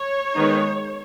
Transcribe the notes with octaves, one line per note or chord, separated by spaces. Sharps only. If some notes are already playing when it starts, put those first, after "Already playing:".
Already playing: C#5
D#3 G#3 B3 D#4